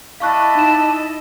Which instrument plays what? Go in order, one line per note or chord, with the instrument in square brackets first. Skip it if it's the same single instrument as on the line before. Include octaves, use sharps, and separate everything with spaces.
[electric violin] E4 D#5 [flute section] D5 A5 B5 [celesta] F5 C#6 F#6
[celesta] D#4 E7